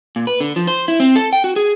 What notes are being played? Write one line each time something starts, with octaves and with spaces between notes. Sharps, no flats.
A#2
B4
D3
F3
C5
E4
C4
A4
G5
F#4
G#4